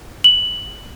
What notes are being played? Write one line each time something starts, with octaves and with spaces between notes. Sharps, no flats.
F#7